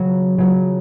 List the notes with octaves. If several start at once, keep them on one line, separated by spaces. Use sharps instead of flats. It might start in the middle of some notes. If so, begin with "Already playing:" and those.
Already playing: C#3 F#3 F#4
C#3 F#3